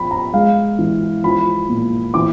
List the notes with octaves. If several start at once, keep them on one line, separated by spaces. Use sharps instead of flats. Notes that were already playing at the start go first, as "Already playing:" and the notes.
Already playing: F3 B5
A#5
G#3 F5
E3
F3 B5
A#2
E3 D6